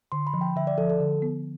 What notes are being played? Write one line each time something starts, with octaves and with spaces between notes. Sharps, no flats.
D3 C6
B5
F3
G5
D3 E5
D5
F3 A4
A4
D3
B3